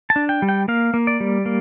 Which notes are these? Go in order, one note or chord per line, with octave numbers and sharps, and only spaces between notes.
A5
D4
G5
G3
G5
A#3 F5
A#3
D5
G3
A#3